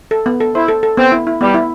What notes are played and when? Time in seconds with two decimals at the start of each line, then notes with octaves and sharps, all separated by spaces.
0.11 A4
0.26 B3
0.40 A4
0.55 E4 C5
0.68 A4
0.83 A4
0.97 B3 C4
1.12 E4
1.27 E4
1.41 G3 B3
1.54 E4